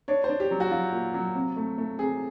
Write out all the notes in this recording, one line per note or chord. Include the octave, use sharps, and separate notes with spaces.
D4 C#5
C5
D4
G4
F#3
F#4
F#3 F4
A#2
F#3
C3
A3
A3
C3 G#4